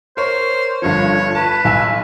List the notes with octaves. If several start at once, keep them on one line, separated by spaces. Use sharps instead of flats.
A#4 C5 C#5
G1 G2 F3 C#5
B4 A5
B1 G#5 E6